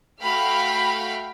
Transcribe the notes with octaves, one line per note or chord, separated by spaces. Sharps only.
A3 F#4 F5 G5 B5 F6